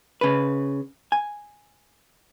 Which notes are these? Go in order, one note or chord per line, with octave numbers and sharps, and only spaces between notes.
C#3 B4
G#5